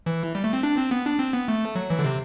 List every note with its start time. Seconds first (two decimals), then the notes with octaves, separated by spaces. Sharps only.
0.06 E3
0.35 G3
0.44 A3
0.53 C4
0.63 D4
0.77 C4
0.91 B3
1.06 D4
1.19 C4
1.33 B3
1.48 A3
1.75 F#3
1.90 E3
1.99 D3
2.04 C3